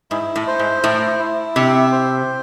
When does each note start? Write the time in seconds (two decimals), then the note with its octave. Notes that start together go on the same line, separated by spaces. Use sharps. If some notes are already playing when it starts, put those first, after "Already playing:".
0.11 G#2 E4
0.36 A2
0.47 C5
0.59 G#2
0.83 A2 E4
1.19 E4
1.56 C3 E5
1.92 C5